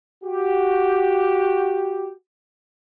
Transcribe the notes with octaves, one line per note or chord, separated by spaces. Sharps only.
F#4 G4